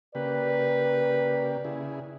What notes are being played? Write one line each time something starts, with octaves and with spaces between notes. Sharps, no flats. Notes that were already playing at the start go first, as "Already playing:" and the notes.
C#3 A#3 G4 B4 D5
C#3 E4 G#4